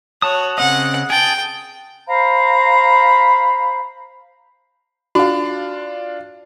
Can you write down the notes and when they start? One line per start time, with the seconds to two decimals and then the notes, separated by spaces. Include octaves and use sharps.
0.22 F#4 C#5 A5 D#6
0.58 C#3 C4 D#5 F#5
1.10 G#4 G5 A5
2.07 C5 F5 A#5 B5
5.15 D4 F4 F#4